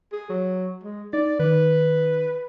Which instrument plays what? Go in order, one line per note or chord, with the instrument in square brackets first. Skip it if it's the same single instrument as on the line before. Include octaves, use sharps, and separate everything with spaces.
[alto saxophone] G#4
F#3
G#3
[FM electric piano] D#4 A6 [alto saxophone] D5
[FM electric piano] D#3 [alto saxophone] B4